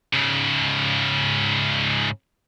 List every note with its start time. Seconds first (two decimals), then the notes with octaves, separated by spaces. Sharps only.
0.14 G#2 C#3